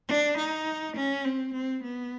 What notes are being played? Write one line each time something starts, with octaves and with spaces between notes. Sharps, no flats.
D4
D#4
C#4
C4
C4
B3